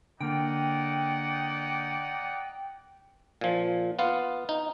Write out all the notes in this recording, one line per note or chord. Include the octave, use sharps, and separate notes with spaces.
D3 A#3 D#4 D5 F#5 G5
A#2 F3
B3 F4 F5
D#4